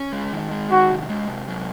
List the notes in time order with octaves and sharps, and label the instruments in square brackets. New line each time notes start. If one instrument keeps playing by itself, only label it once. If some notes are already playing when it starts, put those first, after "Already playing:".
Already playing: [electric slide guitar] C#4
G#3
D#3
G#3
[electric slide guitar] D#3 [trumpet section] F#4
[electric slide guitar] C3
G#3
C3
F#3